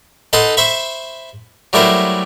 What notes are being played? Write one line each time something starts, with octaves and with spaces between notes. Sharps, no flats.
D#4 A4 B4 F#5 C6
C5 E5 B5 C#6
F#3 G3 A3 E4 A#4 C5